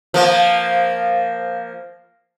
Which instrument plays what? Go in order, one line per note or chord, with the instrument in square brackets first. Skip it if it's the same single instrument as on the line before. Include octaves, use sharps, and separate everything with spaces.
[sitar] F3 A#3